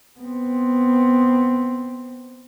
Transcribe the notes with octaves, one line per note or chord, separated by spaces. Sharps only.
B3 C4